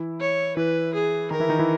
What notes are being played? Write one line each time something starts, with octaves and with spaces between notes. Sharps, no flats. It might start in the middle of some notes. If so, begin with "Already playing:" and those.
Already playing: E3 E4
C#5
E3 E4 B4
G#4
D#3 D#4 A#4
E3 E4
D#3 D#4
E3 E4